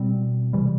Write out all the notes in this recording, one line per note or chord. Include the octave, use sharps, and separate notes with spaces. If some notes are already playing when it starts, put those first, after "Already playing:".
Already playing: B2 G3 C4
C3 E3 G3